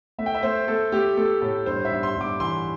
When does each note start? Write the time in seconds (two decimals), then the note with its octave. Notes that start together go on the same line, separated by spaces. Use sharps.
0.18 A3 E5
0.26 G5
0.35 E5
0.43 A3 C5
0.68 A3 A4
0.92 A3 G4
1.17 A3 A4
1.41 A2 A4
1.66 G2 C5
1.85 E5
1.91 G2
2.03 C6
2.16 G2
2.21 D6
2.40 E3 C6